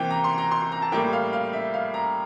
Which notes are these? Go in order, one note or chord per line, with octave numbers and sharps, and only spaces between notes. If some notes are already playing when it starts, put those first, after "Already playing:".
Already playing: C3 E3 A#3 G5
A#5
C6
A#5
C6
C6
A#5
A5
A2 G3 A#3 G5
F5
F5
E5
F5
A#5